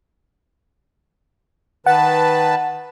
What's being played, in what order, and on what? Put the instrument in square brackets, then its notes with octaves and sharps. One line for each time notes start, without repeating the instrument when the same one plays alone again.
[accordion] D#3 B4 A5 [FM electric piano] F#5